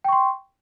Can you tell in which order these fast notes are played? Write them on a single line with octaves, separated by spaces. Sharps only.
G5 C#6 C6